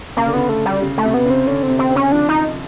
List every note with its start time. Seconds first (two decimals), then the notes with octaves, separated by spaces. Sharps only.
0.17 C#3 A#3
0.26 D3
0.33 C#3 B3
0.49 A3
0.65 G3
0.82 C#3
0.98 A3
1.03 C3
1.14 B3
1.26 C#3 C4
1.47 D3 C#4
1.63 C4
1.68 C3
1.79 C4
1.90 C#3
1.96 C#4
2.12 F3 D4
2.29 D#4